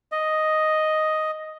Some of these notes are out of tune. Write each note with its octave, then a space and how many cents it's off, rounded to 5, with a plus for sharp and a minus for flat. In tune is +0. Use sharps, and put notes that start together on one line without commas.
D#5 +0